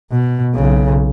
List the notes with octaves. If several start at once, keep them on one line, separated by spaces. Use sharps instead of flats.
B2
B1 C#3